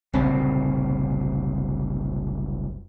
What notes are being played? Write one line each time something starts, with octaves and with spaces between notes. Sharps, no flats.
F#1 C2 A#2 C4